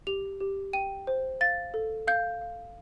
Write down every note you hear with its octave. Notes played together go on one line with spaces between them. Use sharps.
G4 F7
G4
G5 D#7
C5
F5 A6
A4
F5 G6
F5